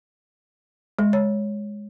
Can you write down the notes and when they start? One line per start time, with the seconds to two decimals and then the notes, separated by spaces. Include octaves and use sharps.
0.99 G#3
1.13 C#5